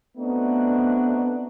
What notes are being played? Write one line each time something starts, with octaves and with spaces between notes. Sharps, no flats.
A3 B3 C4 D4 D#4 F#4